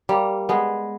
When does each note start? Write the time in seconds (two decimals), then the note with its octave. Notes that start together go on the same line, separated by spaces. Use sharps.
0.09 G3 A#3
0.49 G#3 B3